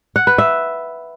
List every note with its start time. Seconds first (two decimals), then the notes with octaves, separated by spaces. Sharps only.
0.16 F#5
0.27 B4
0.38 E5